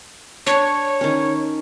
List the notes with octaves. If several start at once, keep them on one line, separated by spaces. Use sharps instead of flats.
D4 C#5
D#3 C#4